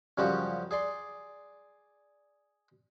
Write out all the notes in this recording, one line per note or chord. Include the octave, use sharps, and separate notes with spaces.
F#2 C#3 F3 G3 F#4
G#4 D5 C6